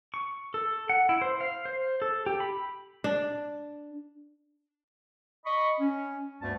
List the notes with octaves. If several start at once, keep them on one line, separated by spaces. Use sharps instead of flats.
C#6
A4
F#5
E4
C5
F5
C5
A4
G4
B5
D4
D#5 B5 C#6
C#4
D2 G2 G3 A3 B3 A5